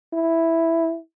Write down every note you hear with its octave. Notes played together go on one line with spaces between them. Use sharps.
E4